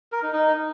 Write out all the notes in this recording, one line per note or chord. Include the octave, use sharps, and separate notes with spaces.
A#4
D#4
D#4